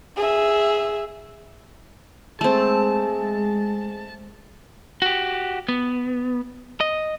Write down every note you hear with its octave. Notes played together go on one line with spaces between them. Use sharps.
G#4 E5
G#3 A3 C4 G#4 A5
F#4 G4
B3
D#5